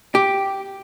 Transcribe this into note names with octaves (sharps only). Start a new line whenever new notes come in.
G4